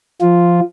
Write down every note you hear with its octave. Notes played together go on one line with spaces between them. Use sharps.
F3 F4